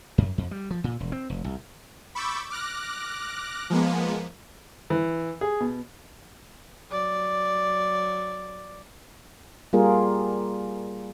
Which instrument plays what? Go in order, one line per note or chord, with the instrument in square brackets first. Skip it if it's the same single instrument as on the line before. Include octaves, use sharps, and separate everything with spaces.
[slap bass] F#2
F2
G3
F3
A#2
E1
C4
F1
C2
[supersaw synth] B5 C#6 D6 E6 G6 A6
D6 F6 F#6 A#6
F3 G#3 A#3 B3
[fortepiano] E3
G#4
B2
[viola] F#3 D5
[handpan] G3 A#3 F4 G#4 A#4